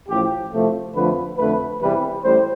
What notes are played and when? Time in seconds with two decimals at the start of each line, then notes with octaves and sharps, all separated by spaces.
0.09 A1 A2 F3 G4
0.52 C2 C3 F3 A3
0.95 F2 D3 F3 A3 B4
1.37 F2 D3 A3 B4
1.80 E2 C3 E3 G3 B4
2.22 A1 A2 G3 C5